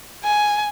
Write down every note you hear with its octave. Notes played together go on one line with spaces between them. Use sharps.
G#5